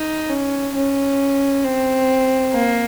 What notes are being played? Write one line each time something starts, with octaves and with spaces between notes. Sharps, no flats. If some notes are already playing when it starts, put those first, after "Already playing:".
Already playing: D#4
C#4
C#4
C4
A#3